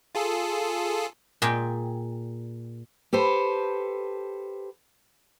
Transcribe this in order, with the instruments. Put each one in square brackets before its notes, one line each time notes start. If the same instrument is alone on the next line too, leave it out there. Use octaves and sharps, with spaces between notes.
[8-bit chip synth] F4 G#4 A4
[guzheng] A#2 G#4 G5
[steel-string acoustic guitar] G4 A4 B4 C5